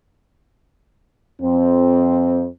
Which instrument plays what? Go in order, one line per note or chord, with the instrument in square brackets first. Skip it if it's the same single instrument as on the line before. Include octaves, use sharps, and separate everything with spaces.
[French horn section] F2 C4